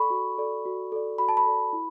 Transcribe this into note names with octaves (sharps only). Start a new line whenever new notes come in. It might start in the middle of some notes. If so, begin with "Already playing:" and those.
Already playing: A4 D5 B5 C#6
F#4
A4 D5
F#4
A4 D5
F#4 B5
A5
B5
A4 D5
E4